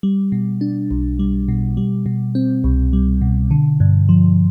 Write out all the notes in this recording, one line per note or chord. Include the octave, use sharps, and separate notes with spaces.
G3
B2
D4
B1
G3
B2
G3
B2
C4
C2
G3
B2
D3
G2
F3